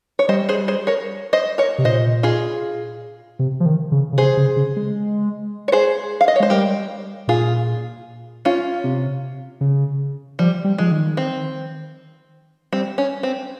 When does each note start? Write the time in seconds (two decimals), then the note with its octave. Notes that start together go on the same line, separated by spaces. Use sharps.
0.19 C#5
0.29 G3 C5 D#5
0.49 G#4 C5
0.68 G#4 C5
0.87 A#4 C#5
1.33 C5 D#5
1.58 A#4 C#5
1.78 C3
1.85 A#2 C5 D#5
2.23 F4 G#4
3.39 C3
3.60 F3
3.66 D#3
3.92 C#3
4.13 C#3
4.17 C3 G#4 C5
4.37 C#3
4.56 C#3
4.76 G#3
5.68 C#5
5.72 G#4 C5
6.21 F5
6.28 D#5
6.36 C#5
6.40 G#3 C5
6.50 G3 G4 A#4
7.28 A#2 F4 G#4
8.45 C#4 F4
8.84 C3
9.61 C#3
10.39 F3 G3
10.64 G3
10.78 F3 G#3
10.91 D#3
11.17 C4
12.72 G3 C4
12.98 C#4
13.23 C4